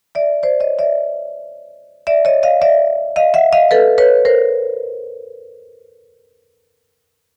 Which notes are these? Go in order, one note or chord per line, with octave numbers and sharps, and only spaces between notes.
D5 E5
C5 D5
C#5 D#5
D5 E5
D5 E5
C#5 D#5
D#5 F5
D5 E5
D#5 F5
E5 F#5
D#5 F5
A4 B4
B4 C#5
A#4 C5